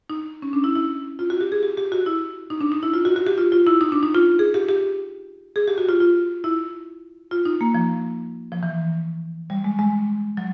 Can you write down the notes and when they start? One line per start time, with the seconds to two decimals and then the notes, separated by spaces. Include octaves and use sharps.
0.10 D#4
0.42 C#4
0.53 D4
0.64 E4
0.75 E4
1.19 F4
1.30 F#4
1.41 G4
1.52 G#4
1.63 G4
1.77 G4
1.92 F#4
2.06 E4
2.50 D#4
2.61 D4
2.72 D#4
2.83 E4
2.94 F4
3.05 F#4
3.16 F#4
3.27 G4
3.38 F4
3.52 F4
3.67 E4
3.81 D#4
3.92 D4
4.03 D#4
4.15 F4
4.39 G#4
4.54 G4
4.69 G4
5.56 G#4
5.68 G4
5.78 F#4
5.89 F4
6.00 F4
6.44 E4
7.31 F4
7.45 D#4
7.61 A#3
7.74 F3
8.52 F3
8.63 E3
9.50 G3
9.64 G#3
9.79 G#3
10.37 F#3